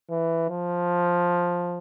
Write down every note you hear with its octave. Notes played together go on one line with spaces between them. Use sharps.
E3
F3